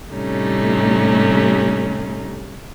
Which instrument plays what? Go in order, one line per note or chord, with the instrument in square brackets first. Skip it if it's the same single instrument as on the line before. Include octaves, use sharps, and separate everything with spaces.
[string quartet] A2 C3 G3 A3 C#4 D#4